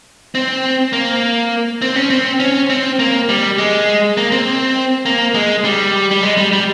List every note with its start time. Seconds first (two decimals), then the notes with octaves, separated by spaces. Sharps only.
0.35 C4
0.93 A#3
1.82 C4
1.96 C#4
2.10 C4
2.40 C#4
2.70 C4
2.99 A#3
3.29 G3
3.58 G#3
4.17 A#3
4.32 C4
5.06 A#3
5.34 G#3
5.64 G3
6.11 G3
6.23 G#3
6.37 G3
6.53 G3